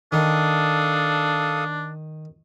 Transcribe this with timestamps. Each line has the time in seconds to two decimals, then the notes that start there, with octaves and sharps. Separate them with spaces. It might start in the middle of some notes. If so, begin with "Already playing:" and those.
0.12 D#3 D4 A4 F5 D#6